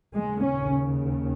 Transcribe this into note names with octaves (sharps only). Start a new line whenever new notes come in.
D#2 C#3 G#3
C#4